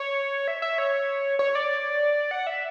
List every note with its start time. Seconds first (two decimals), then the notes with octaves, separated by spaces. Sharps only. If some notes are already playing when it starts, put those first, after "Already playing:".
Already playing: C#5
0.48 E5
0.62 E5
0.78 C#5
1.39 C#5
1.55 D5
2.31 F#5
2.47 E5